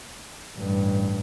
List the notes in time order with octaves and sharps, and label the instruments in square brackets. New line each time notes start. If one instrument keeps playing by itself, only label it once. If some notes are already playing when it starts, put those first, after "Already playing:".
[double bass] A1 G2